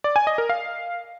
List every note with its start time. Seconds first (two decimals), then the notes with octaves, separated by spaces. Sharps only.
0.04 D5
0.16 G#5
0.27 D#5
0.38 A#4
0.49 F5